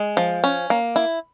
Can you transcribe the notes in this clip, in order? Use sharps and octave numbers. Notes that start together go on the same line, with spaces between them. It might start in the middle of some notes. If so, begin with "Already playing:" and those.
Already playing: G#3
F3
C#4
A#3
E4